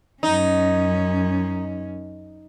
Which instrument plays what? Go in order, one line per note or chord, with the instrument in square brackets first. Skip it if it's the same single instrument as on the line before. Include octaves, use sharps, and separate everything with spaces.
[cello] F#2 C#4 [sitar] D#4